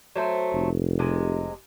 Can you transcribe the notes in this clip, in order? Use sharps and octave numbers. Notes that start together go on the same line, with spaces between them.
F#3 A3 C5
F1
C3 G#3